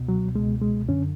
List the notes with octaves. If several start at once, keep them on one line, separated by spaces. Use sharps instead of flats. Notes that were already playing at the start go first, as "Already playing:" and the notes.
Already playing: C#2 B2
F#3
C#2 B2 G#3
G#3
F#2 D3 C#4